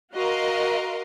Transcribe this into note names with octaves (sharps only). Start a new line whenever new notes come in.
F#4 A#4 D#5 F5 C6